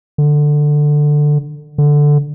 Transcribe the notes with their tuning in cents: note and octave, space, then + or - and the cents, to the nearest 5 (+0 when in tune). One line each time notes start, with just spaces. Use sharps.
D3 +10
D3 +0